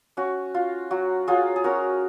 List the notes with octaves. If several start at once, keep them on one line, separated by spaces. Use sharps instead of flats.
C#4 F#4
F4
F#3 F#4
F#3 F4 G#4
G#4
C#4 F#4 A#4